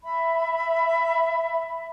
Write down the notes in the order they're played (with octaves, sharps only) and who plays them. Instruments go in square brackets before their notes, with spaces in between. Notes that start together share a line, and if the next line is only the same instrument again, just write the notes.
[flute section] E5 B5